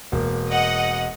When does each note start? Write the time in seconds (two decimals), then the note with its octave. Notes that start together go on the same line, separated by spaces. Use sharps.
0.12 E1 A#3
0.49 D#5 F#5